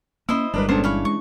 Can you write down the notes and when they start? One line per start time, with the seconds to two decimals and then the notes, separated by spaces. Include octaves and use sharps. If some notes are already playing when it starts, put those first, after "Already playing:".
0.29 A#3 C#4 E4 C5 D#5 E6
0.54 G1 G3 G#3 D4 A#4 B4
0.69 A#2 G#3 B3 C#4 D4 A4 C5
0.84 E3 C#5 F5 B5
1.05 G#3 C#6